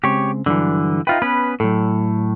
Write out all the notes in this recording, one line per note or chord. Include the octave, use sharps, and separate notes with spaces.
C#3 G#3 C4 G4 C#5
G2 D3 E3 F#3 D4
D#4 F4 B4 E5 G5
B3 C#4 B4 B5
A2 F#3 A4